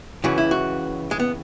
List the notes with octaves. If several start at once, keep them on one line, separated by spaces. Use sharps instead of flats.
C#2 C#3 E3 F#4
E4
F#4
G#3
B3